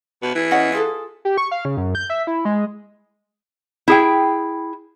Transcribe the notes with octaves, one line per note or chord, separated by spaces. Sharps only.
B2
E3
C#4 D#5 F#5
F4 G#4 A4
G4
C#6
F5
C#3
F#2
G6
E5
E4
G#3
E4 G#4 G5